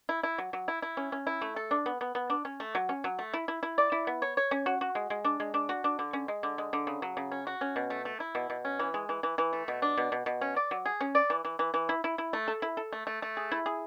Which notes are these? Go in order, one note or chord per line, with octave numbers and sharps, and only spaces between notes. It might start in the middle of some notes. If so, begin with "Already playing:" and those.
E4
E4
F#3
F#3
E4
E4
C#4
C#4
E4
A3
A4
D4
B3
B3
B3
D4
C#4
A3
F#3
C#4
F#3
A3
E4
E4
E4
D5
E4
B3
C#5
C#5
C#4
F#4
F#4
G#3
G#3
D4
G#3
D4
F#4
D4
D3
C#4
G#3
D3
G#3
D3
C#3
F#3
C#3
C#4
F#4
C#4
B2
A3
A3
E4
B2
B2
C#4
E3
G#3
E3
E3
E3
A3
B2
D4
B2
B2
B2
C#4
D5
F#3
G#4
C#4
D5
E3
E3
E3
E3
E4
E4
E4
A3
A4
E4
A4
A3
A3
A3
G#4
E4
G#4